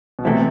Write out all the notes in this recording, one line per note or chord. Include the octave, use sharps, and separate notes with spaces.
B2
C3 E3 A3 C4